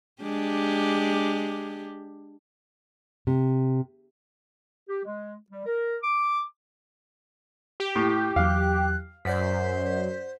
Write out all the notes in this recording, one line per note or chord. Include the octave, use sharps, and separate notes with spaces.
G#3 D4 G4
C3
G4
G#3
G3
A#4
D6
G4
A2
E2 F#3 F5 F#6
F#2 C5 D5 F#5 B6